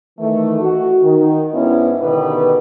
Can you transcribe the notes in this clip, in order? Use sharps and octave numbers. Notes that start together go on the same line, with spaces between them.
D#3 E3 A3
F#4
D#3
G#2 B3 C#4 D4 E4
B2 D3 D#3 G4 B4